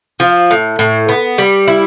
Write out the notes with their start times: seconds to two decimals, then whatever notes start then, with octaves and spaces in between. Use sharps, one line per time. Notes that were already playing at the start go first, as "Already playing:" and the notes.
0.20 F3
0.51 A2
0.79 A2
1.09 B3
1.38 G3
1.67 E4